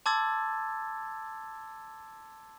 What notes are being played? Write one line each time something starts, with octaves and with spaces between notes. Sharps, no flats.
A5 C6 D6 E6 G#6 A6